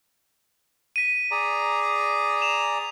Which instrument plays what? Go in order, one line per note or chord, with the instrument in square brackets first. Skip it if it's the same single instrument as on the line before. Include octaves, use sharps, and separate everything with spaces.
[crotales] B6 D#7
[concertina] G#4 D5 A#5
[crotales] E7 F7